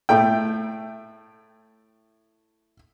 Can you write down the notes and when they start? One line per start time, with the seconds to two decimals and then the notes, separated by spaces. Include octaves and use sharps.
0.09 A2 A3 G5